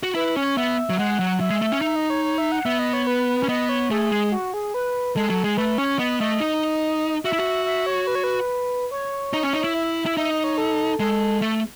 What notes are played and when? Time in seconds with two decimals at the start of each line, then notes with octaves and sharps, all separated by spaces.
0.03 F#4
0.15 E4 B4
0.36 C#4 C#5
0.57 B3 E5
0.90 F#3
0.99 G#3 F#5
1.20 F#3
1.40 F#3 E5
1.50 G#3
1.62 A3
1.72 C#4
1.81 D#4 E5
1.96 D#5
2.10 C#5
2.24 C#5
2.38 E5
2.52 F#5
2.65 B3 E5
2.79 D#5
2.93 C#5
3.07 B4
3.43 C#4
3.49 B3 D#5
3.69 C#5
3.91 A3 G#4
4.11 G#3
4.32 F#4
4.54 G#4
4.74 B4
5.16 G#3 A4
5.30 F#3 A4
5.44 G#3 G#4
5.57 A3 B4
5.78 C#4 C#5
5.99 B3 D#5
6.20 A3 D#5
6.40 D#4
7.24 F#4 E5
7.33 E4
7.39 F#4
7.66 E5
7.86 C#5
8.07 B4
8.15 C#5
8.24 B4
8.91 C#5
9.33 D#4
9.43 C#4
9.53 D#4
9.64 E4
9.74 E5
10.06 E4
10.16 D#4 E5
10.30 D#5
10.44 C#5
10.58 A4
11.00 G#3 A4
11.42 A3